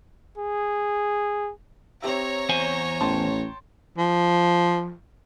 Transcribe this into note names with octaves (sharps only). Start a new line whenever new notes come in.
G#4
C4 G4 C#5 E5 A#5
E2 C5 G#5
A1 G5 A5 C6
F3